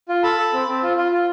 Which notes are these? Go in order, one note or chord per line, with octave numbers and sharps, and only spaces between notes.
F4
A4 A5 B5
A4
C4
C4
F4
F4
F4